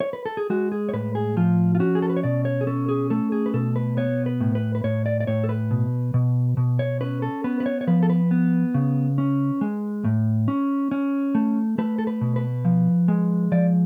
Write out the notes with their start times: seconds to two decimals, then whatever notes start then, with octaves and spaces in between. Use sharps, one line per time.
0.00 C#5
0.13 B4
0.26 A4
0.37 G#4
0.50 G#3 F#4
0.72 G#4
0.89 C#5
0.93 A2 B4
1.15 G#4
1.37 F3 F4
1.75 F4
1.80 C#4 F#4
1.95 G#4
2.02 A4
2.10 B4
2.17 C#5
2.23 B2 D5
2.45 C#5
2.61 G#4
2.67 C#4 A4
2.89 G#4
3.10 A3 A4
3.32 G#4
3.46 B4
3.54 B2 A4
3.76 B4
3.97 B3 C#5
4.26 B4
4.41 A2
4.55 B4
4.75 B4
4.84 A2 C#5
5.06 D5
5.20 D5
5.27 A2 C#5
5.44 A4
5.49 B4
5.71 B2
6.14 B2
6.57 B2
6.79 C#5
7.01 C#4 B4
7.22 A4
7.44 B3 B4
7.60 B4
7.66 C#5
7.81 C#5
7.87 F3 B4
8.03 A4
8.10 B4
8.31 B3
8.74 C#3
9.18 C#4
9.61 G#3
10.04 A2
10.48 C#4
10.91 C#4
11.35 A3
11.78 A3 B4
11.98 A4
12.07 B4
12.21 B2
12.36 B4
12.65 F3
13.08 G#3
13.52 F3 D5